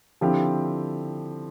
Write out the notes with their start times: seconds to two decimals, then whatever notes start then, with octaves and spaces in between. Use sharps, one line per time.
0.21 D3 F3 C4 E4 G4